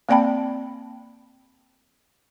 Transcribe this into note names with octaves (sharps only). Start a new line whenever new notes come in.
A#3 C4 D5 G5 A5 B5